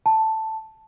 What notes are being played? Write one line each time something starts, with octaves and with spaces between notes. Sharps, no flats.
A5